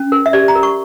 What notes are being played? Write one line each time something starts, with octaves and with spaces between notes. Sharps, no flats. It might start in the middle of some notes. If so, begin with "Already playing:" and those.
Already playing: C#4
A#4
E5
G4 D5
A#5
A#4
C#6